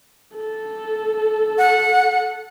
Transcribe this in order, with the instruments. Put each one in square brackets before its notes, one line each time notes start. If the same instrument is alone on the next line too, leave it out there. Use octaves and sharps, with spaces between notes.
[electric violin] A4
[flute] F#5